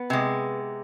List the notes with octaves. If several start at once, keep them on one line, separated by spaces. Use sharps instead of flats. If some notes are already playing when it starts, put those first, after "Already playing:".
Already playing: B3
C3 G#3